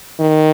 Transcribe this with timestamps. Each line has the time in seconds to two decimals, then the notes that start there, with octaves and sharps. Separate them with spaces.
0.20 D#3